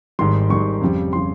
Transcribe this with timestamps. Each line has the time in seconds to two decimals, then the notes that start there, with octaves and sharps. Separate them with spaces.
0.19 G#1 G#2 D#3 G3 C6
0.50 G#1 G#2 D#3 G3 C#6
0.81 F2 C#3 G3
1.13 C#3 G3 C6